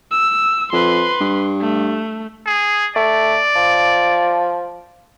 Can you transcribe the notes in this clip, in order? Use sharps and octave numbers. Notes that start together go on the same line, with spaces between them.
E6
F2 B4 C6
G2
A3
G#4
A3 D5
F3